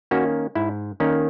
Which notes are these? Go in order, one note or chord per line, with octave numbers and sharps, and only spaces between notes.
D#3 A#3 C#4 F#4
G#2 E4
D#3 A#3 C#4